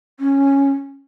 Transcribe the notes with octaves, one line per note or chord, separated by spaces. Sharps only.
C#4